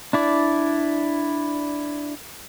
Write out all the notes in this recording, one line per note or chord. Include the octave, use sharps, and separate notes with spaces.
D4 E4 D5